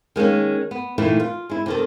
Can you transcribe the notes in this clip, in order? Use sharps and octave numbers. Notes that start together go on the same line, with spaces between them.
D#3 G#3 A#3 C#4
B3
A#2 D#3 E3 A3 E4
F4
G#3 E4
C3 D#3 A4